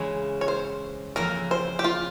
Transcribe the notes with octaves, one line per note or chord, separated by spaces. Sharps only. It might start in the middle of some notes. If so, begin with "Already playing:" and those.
Already playing: C#3 E3 G#3 E4 C#5
C#5
C5
F2 C#3 E3 A#3 A#4
C5
G4
F4